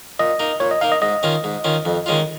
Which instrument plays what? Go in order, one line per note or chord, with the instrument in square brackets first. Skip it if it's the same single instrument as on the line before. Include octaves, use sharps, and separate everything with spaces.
[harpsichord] A#2 [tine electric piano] D#5
[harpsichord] A#3 D#4
[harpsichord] A#2 [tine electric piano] C#5
[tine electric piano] D#5
[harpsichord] A#3 D#4 [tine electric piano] F5
[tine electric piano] D#5
[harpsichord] G#2 [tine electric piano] D#5
[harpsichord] D#3 C#4 F4
G#2
D#3 C#4 F4
F2
D#3 G#3 C#4 F4